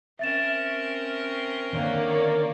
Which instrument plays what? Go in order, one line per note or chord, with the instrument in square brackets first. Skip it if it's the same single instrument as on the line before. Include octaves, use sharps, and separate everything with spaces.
[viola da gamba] C4 C#4 A#4 [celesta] E5 A6 E7
[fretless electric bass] D3 D#3 [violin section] A#3 C#5 D5